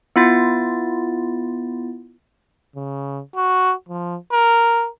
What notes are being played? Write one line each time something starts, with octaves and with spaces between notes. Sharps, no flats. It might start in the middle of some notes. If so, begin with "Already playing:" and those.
B3 E4 F4 A6
C#3
F#4
F3
A#4